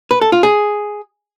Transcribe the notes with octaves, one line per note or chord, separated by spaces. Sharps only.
B4
A4
F4
G#4